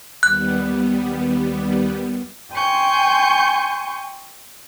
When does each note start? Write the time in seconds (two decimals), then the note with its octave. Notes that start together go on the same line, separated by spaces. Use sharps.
0.23 D#2 G3 B3 F#6
2.53 G5 G#5 C6 C#6 G6